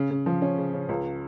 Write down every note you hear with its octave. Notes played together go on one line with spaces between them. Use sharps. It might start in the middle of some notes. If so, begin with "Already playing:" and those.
Already playing: C#3
C#3
F3
C#4
C#3
C#3
C#2